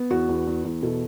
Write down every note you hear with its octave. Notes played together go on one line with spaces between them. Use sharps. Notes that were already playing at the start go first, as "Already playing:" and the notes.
Already playing: B3
E2 F#4 B4
E2
E2
E2
B2 E4 A4